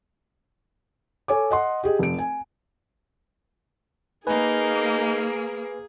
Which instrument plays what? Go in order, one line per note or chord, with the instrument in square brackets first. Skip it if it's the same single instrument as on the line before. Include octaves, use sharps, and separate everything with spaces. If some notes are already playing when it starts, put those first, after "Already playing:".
[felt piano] A4 C#5 G#5 D6
D#5 F#5 C6
G4 G#4 D#5
F1 D7
G#5
[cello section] A#3 [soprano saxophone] D#4 [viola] G#4 [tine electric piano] B4 G#5